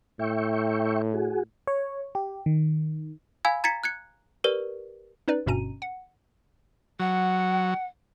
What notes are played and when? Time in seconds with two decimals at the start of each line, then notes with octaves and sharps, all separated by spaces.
0.19 A2 E5 G5 C#6
1.14 F#4 G#4
1.67 C#5
2.15 G4
2.46 D#3
3.45 F5 G#5 B5 E6 G#6
3.64 A#5 G#6 A6 B6 C#7
3.84 F#6 G#6 C#7
4.44 G4 A#4 B4 D5 G7
5.28 C#4 D#4 B4 D5
5.46 G1 G2 B2 C#4 A#5 D#7
5.82 F#5
7.00 F#3 F#5